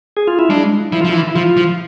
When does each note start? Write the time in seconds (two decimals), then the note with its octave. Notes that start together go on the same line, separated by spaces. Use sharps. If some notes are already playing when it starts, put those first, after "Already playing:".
0.17 G#4
0.28 F4
0.39 E4
0.50 G#3 D4
0.92 F3 E4
1.01 F4
1.05 F3
1.09 E4
1.14 E3
1.28 E4
1.35 F3 F4
1.57 F3